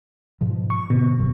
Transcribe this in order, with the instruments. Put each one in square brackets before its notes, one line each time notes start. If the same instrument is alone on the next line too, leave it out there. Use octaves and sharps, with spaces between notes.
[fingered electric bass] G#2 B2 F3
[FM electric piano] C#6
[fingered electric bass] G#2 D3 [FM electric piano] B2
[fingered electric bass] D1 F#2 F#3